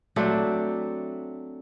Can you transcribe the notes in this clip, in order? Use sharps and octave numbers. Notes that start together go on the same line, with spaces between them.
F#3 A3 C4 D4